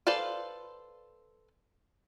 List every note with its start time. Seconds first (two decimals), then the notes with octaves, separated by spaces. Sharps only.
0.07 A4 B4 C5 D5 F5